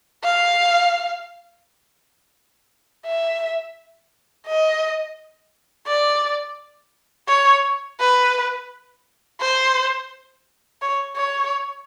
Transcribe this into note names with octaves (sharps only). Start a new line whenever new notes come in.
F5
E5
D#5
D5
C#5
B4
C5
C#5
C#5